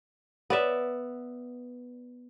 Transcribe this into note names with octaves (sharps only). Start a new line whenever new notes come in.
B3 D5 E5